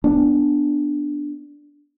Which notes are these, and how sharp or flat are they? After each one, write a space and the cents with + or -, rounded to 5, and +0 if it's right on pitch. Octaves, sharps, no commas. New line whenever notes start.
B3 +0 D4 +0